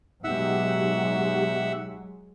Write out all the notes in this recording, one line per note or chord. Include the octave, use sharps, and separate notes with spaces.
B2 F#3 G#3 D#4 G4 E5 F#5 E6